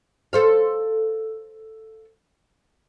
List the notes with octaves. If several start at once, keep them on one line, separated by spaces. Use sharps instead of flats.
A4 C5 F5